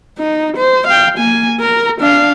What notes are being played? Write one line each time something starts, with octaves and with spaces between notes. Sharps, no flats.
D#4
C5
F5 G5
A#3 G#5
A#4 A#5
D4 F5